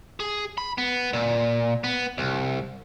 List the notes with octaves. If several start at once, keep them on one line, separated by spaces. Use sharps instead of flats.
G#4
B5
B3
A#2
B3
C2